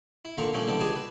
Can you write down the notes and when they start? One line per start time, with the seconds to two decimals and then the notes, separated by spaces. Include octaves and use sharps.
0.25 E4
0.38 A#2 D3 D#3 F4 A#5 C#6
0.53 A#2 F3 G3 A3 A#3 C#4
0.67 B2 D3 E3 G3 B3 D4
0.80 C#2 G4 G#4 D#5 G#5 A5
0.96 B4